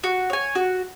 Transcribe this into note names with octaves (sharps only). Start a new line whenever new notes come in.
F#4
C#5 G#5
F#4